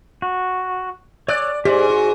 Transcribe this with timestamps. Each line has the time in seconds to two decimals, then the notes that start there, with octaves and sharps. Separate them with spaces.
0.22 F#4
1.28 C#5 D5 E6 F#6
1.65 G#2 G4 C5 D5
1.90 F#4